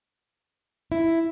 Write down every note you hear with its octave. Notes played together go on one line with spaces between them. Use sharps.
E4